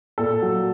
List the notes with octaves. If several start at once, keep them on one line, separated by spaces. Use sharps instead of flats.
A#2 A4
F#3